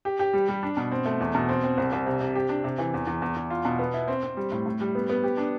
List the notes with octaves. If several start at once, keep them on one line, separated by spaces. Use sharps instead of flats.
G4
G4
G3
G3
D4
B2
C4
A3
E2
B2
C4
C4
C2
C2
C3
C3
G4
D4
C3
E3
E2
E2
E2
E2
F4
B2
B3
E4
C4
C4
G3
A2
A2
G3
B3
B3
G4
D4